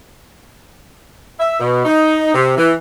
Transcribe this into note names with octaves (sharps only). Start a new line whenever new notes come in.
E5
B2
D#4
C3
E3